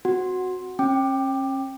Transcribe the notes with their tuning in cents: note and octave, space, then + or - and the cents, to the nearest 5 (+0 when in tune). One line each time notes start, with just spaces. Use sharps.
C4 +0 F#4 -5 F#5 +0
C#4 -40 G5 +0 D6 +15